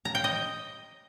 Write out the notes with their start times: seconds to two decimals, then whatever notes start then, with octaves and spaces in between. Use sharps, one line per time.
0.05 A#5
0.15 G5
0.24 D#5